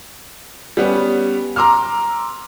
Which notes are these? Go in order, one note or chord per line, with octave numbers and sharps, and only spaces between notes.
G3 B3 C#4
A#5 C6 D6 E6 F6